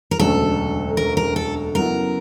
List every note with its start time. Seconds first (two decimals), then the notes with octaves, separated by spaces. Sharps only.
0.11 A#4
0.19 E1 D2 C#3 F#3 A3 A4
0.97 A#4
1.17 A#4
1.36 A4
1.75 F#2 C#3 F#3 B3 E4 A#4